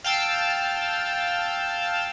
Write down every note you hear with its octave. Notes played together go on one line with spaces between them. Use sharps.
F5 G5 A5 E6